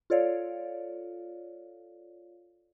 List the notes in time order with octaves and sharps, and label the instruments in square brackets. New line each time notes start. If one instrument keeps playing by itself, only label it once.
[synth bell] F4 A4 C#5 D5 F5